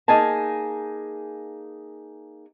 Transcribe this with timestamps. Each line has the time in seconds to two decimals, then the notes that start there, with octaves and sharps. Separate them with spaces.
0.08 A#3 D#4 G#4 G#5 A5